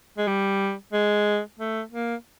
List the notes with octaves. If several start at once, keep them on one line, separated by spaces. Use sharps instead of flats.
G#3
G3
G#3
A3
A#3